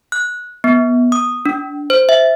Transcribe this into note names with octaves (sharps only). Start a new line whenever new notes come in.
F#6
B3
D#6
D4
C5
E5